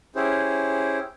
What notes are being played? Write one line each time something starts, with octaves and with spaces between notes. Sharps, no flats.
C#4 E4 G4 G#4 C5